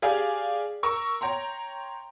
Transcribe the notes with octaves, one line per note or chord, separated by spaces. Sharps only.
G4 G#4 D5 F5
A#4 C#6 E6
C#5 G5 A#5 C6